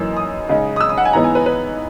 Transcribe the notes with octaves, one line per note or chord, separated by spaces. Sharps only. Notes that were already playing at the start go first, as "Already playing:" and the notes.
Already playing: F#2 E3 A#3 D#4 E6
D#6
C#3 G#3 D#4
D#6
E6
D#6
F#5
G#5
G#2 E3 B3 D#4 A#5
G#5
B4
B4